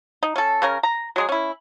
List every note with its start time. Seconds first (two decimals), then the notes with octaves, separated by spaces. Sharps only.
0.23 D#4
0.36 C#4 A4
0.62 C#3 C#4 A#4
0.83 A#5
1.16 F#3 G#3 G#4
1.29 C#4 E4